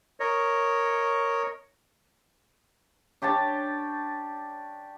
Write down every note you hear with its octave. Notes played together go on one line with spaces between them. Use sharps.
A#4 C#5 D#5
D4 G4 C#5 A5